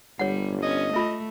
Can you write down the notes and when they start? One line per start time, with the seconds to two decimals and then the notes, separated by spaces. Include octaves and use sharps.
0.19 G1 G3 C#5 F#5
0.63 C#4 D#5
0.94 A3 F4 E5